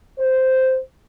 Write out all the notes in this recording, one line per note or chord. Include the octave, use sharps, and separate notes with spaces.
C5